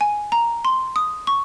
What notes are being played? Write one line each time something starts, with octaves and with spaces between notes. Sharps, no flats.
G#5
A#5
C6
D#6
C#6